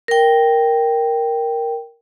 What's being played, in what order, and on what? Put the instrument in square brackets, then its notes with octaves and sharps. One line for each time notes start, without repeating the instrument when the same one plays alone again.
[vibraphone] A#4 G5